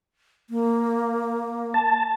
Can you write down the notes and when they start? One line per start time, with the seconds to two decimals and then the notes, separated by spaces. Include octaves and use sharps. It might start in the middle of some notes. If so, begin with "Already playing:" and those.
0.50 A#3
1.74 A5